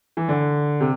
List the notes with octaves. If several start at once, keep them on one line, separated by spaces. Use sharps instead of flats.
E3
D3
C3